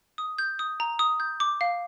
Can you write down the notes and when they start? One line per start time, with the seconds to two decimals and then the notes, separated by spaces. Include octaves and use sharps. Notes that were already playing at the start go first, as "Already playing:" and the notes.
0.18 D#6
0.38 G6
0.59 D#6
0.80 A#5
0.99 D#6
1.20 G6
1.40 D6
1.61 F5